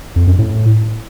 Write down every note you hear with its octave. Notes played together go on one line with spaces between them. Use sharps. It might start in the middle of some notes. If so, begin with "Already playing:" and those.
F2
F#2
A2